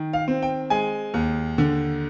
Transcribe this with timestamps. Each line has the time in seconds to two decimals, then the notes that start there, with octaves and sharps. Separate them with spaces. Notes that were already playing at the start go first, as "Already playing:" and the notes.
Already playing: D#3
0.13 F5
0.28 C4
0.43 G5
0.70 G#3 G#5
1.14 D#2
1.58 D3